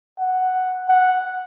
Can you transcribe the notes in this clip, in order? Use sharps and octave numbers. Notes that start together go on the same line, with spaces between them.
F#5
F#5